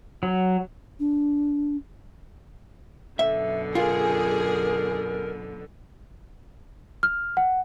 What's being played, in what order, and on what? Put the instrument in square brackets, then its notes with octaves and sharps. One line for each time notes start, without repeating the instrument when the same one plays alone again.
[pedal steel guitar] F#3
[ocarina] D4
[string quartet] F#2 B2 D3 [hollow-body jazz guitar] E5
[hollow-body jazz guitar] F4 [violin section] G#4 [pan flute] A#4
[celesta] F6
F#5